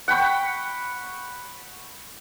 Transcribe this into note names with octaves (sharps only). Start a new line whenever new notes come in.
F#5 G5 B5 C#6